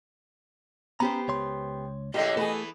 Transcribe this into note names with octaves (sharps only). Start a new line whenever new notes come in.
B3 C#4 G4 C5 A#5
C#2 C#5 C6
A2 D3 G#3 G4 D#5
E3 A3 B3 G#4 A4